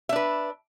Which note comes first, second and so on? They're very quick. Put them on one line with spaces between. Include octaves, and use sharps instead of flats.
E5 D4 B4